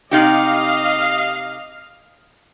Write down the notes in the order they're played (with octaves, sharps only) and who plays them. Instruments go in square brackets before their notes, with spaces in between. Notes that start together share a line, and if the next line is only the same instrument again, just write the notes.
[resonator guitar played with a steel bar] C3 D#4 G4 [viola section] D#5 F5